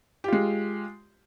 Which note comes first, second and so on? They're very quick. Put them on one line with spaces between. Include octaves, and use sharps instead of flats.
G4 F4 G#3